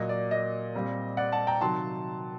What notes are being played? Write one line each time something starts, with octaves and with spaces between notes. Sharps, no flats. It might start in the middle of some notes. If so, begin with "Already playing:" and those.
Already playing: A#2 F#3 A#3 D#5
D5
D#5
A#2 G3 C4
D5 F#5
F#5 A5
G5 A#5
C3 D#3 F#3 A5 C6